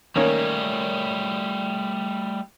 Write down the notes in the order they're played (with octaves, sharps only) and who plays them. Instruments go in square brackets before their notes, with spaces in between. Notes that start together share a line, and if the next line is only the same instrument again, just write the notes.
[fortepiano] D#3 A#3 C#4 [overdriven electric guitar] G3 A3